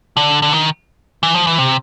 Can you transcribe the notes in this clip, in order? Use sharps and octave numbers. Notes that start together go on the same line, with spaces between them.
D3
D3
D#3
E3
F3
E3
C3